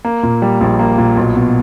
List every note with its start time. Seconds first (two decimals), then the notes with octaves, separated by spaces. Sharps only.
0.05 A#3
0.23 A#2
0.42 G3
0.61 A#1
0.79 A#3
0.98 A#2
1.17 B1
1.36 B2